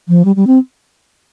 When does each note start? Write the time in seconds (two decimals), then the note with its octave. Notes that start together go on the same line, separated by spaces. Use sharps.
0.08 F3
0.25 G3
0.36 G3
0.47 C4